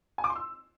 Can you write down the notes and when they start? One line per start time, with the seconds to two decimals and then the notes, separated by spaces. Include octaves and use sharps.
0.18 G#5
0.24 D6
0.30 C6
0.36 E6